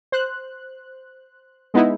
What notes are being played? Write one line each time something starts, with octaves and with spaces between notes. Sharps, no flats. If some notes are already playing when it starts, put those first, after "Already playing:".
C5 F#6
G#3 B3 D#4 E4